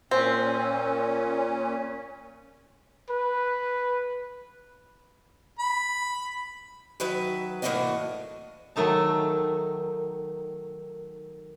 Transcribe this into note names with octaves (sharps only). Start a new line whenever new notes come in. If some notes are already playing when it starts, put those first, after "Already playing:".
A#2 C4 C#4
B4
B5
D#3 F#3 B4 E5
A2 E3 A#3 D4 F#4 D#5
D#3 F#3 A3 D#4 A5